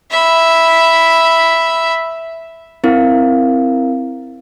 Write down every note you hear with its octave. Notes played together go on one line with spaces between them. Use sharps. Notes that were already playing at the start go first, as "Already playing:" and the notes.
E5 B5
C4 E4 A#4 F5